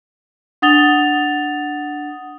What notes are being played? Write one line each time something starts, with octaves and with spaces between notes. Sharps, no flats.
D4 F#5 D#6 A6 F7 G7